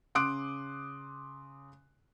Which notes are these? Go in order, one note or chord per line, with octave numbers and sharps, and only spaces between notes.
C#3 C6 D6 D#6 F#6 D7